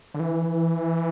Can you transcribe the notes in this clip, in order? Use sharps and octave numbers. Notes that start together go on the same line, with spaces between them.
D3
E3